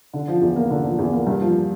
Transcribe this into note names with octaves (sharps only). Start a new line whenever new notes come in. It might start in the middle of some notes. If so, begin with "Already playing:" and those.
D3
F3
E2
A#3
D3
F3
E2
A#3
G2
F3